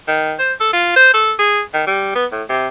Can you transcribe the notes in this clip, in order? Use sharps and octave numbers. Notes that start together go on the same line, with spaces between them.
D#3
C5
A4
F4
C5
A4
G#4
D#3
G3
B3
A2
C3